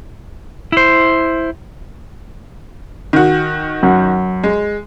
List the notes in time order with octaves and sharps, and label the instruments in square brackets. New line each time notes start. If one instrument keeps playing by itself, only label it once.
[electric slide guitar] E4 C5
[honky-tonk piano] D#3 F#4
[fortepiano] F#2
[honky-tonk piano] G#3